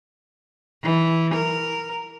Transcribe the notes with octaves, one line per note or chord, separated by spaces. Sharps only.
E3
A#4